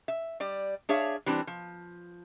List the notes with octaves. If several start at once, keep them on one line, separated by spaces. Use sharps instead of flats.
E5
G3 D5
D4 G#4 C#5 E5 F5
E3 G3 C4 D4
F3